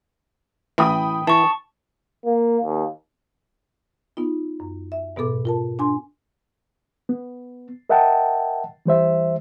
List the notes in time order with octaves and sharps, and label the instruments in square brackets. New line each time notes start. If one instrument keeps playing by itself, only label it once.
[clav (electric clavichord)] A1 E3 [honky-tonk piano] G5 B5 D#6
[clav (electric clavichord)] E3 [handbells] A5 C#6
[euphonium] A#3
D#2
[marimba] B3 D#4 F4
F#2
E5
G#2 B2 B3 A4 D6
F4 A#4 A5
D4 G#5 C6
[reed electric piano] B3
A#4 D#5 E5 F#5 G5 A5
E3 G3 C5 E5